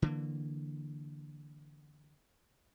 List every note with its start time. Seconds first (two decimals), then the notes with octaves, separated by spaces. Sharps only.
0.02 D3 E3 A#3